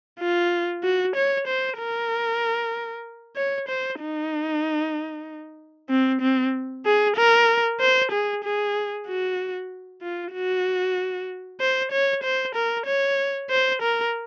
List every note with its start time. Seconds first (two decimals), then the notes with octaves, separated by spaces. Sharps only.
0.20 F4
0.84 F#4
1.16 C#5
1.48 C5
1.79 A#4
3.37 C#5
3.69 C5
4.01 D#4
5.90 C4
6.22 C4
6.86 G#4
7.17 A#4
7.80 C5
8.12 G#4
8.44 G#4
9.08 F#4
10.02 F4
10.34 F#4
11.61 C5
11.92 C#5
12.24 C5
12.56 A#4
12.87 C#5
13.51 C5
13.82 A#4